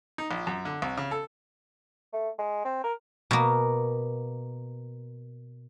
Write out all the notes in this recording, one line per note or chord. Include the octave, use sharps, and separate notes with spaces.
D#4
A#1
F#2
D3
C2
C#3
A4
A3
G#3
C4
A#4
B2 A#3